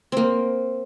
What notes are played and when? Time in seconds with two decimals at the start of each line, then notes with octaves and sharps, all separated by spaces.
0.12 A#3 C4